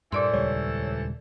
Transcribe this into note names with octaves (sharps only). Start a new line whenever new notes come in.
G2 A#2 E3 A4 C5 D5 C6
D#1 C#2 G3 C#5